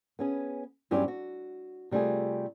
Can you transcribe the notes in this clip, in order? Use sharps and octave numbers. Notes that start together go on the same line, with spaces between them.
B3 C#4 G#4
E2 G2 F#3 C#4 G4 C5
F#4
C3 G3 A3 F4 G#4